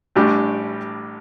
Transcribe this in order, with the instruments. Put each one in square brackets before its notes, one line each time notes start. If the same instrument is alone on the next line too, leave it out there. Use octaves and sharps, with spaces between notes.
[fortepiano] A1 A2 G3 D4 G4